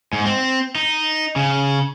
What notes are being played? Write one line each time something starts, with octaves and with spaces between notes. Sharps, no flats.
G#2
C4
D#4
C#3